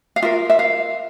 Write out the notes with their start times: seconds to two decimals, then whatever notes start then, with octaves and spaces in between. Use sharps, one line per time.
0.16 F5
0.22 F4 A#4 E5
0.50 E5
0.59 F5